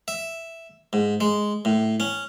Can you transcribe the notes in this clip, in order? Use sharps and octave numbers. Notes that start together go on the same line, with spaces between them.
E5
G#2
G#3
A2
C#4